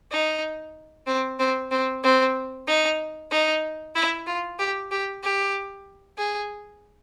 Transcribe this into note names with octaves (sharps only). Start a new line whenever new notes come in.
D#4
C4
C4
C4
C4
D#4
D#4
E4
F4
G4
G4
G4
G#4